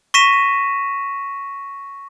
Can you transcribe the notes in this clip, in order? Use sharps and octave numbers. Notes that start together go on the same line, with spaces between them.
C#6 A#6 B6 D#7 E7